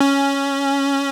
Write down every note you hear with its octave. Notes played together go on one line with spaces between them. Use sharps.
C#4